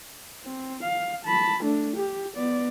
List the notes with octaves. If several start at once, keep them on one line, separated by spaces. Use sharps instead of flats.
C4
F5
A5 B5
A3 D4
G4
B3 D5